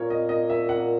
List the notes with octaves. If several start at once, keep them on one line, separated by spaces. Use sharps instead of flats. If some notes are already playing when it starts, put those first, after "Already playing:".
Already playing: A#2 A#4 C#5
D#5
D#5
E5
F#5